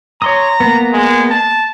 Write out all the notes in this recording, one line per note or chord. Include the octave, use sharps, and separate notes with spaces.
C#5 A#5 C6 D#6
A#3 B3
G#3
A5